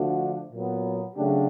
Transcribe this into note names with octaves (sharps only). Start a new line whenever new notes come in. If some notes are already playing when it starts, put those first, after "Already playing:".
Already playing: D3 F3 A3 D4 F#4
A#2 F#3 B3
C#3 F#3 A3 D4 G4